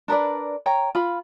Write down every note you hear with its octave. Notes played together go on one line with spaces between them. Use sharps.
D4 A#4 B4 D5
C#5 G5 A#5
F4 B5